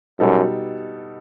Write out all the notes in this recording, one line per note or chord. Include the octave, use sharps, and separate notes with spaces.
F#2 B2 G3 D#4 A4